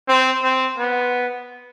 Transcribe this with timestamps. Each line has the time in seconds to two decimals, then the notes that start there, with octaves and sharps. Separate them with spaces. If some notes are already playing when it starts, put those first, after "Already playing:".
0.08 C4
0.43 C4
0.78 B3